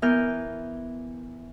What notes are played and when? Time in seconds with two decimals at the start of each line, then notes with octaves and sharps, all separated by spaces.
0.02 E3 B3 A#4 F6 G6